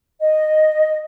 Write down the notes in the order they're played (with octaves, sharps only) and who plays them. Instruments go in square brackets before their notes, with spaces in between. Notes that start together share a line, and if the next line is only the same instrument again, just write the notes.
[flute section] D#5